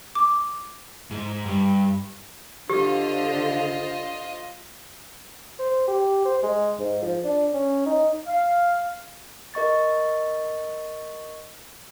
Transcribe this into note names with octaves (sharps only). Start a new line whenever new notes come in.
D6
G#2
G2
D3 F4 G4 C5 D#5
C5
G4
C5
G#3
G#2
F3
D4
C#4
D#4
F5
A#4 D#5 C#6 A6